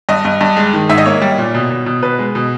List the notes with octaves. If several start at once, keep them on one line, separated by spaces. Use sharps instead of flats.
G2 D#5
G2
G2
G#3
D#3
G#2 E5
D#5
A#3 C#5
G3
A#2
B2
B2
B2
B2 B4
G#3
B2